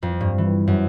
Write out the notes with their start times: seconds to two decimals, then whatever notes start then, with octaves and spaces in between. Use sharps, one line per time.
0.03 F2
0.21 G2
0.38 E3
0.67 F#2